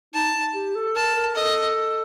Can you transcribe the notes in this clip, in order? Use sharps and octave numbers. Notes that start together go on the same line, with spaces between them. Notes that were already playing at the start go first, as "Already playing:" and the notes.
D#4 A5
G4
A4
A#4 A5
A#4
A4 D#5